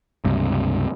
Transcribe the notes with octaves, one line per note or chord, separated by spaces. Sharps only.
C#2 G2 C3